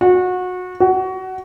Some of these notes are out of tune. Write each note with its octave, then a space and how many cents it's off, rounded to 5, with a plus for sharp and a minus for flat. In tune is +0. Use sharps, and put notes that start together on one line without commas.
F#4 -25
F#4 +20